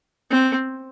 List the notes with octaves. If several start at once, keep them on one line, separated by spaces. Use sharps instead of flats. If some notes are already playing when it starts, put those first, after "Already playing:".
C4